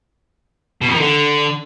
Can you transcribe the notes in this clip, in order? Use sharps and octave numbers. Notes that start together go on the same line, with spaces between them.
B2
F2
D#3
D3